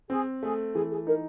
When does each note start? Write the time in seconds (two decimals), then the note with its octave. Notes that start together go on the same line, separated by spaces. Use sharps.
0.10 C4 G#4
0.42 A3 G#4
0.74 E3 G#4
0.91 G#4
1.07 D#4 A#4